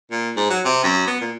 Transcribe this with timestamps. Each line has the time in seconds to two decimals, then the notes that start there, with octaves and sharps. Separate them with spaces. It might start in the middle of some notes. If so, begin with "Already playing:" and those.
0.11 A#2
0.36 G#2
0.50 F#3
0.65 C3
0.84 F#2
1.07 B3
1.21 A#2